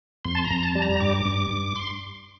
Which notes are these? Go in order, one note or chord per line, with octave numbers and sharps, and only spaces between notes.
F2 C6
A5
A#5
F2
A5
G3
A#5
G2 D6
G2
G2
C6